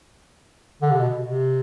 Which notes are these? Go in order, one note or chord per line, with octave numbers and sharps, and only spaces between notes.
D3
C3
B2
C3